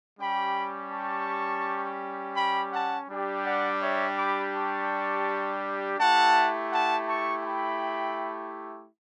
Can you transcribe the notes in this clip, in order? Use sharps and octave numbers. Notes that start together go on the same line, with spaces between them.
G3 C#4 G4 G5 B5
A5 C#6
G5 B5
F#5 A5
G3 D4 G4
D5 F#5
C#5 E5
B5 D6
A5 C#6
A3 E4 G4 F#5 A5
F#5 A5
A5 C#6
G5 B5